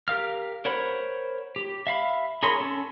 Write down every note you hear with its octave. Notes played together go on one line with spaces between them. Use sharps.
G4 A#4 F5 F6
A#4 C5 C#5 F#5 B5
G4
E5 F5 B5
G#4 A#4 C#5 B5 C6
C#4 A4